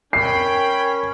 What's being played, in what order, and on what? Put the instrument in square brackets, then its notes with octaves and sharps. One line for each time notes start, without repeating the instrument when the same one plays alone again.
[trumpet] C#4 [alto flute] A#4 [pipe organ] G5 B5 [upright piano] C7